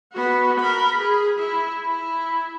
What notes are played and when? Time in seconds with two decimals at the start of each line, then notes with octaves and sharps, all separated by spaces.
0.13 B3 F#4
0.60 A#4 B5
0.97 G#4
1.39 E4
1.86 E4